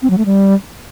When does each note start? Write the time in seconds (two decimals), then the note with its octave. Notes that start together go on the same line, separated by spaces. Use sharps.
0.02 C4
0.10 F#3
0.18 A3
0.26 G3